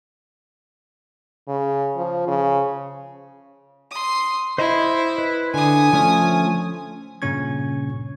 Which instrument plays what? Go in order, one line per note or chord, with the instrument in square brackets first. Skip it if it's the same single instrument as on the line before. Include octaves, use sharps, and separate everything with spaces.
[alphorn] C#3
F3
C#3
[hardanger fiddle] C6 D#6
[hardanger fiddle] E4 [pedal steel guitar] C5 D#5 C6
[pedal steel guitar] B4
[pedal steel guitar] D3 [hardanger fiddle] G#5 D#6
[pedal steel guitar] F3 A3 C#4
[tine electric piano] G2 A#2 C#3 C#4 C#6 G#6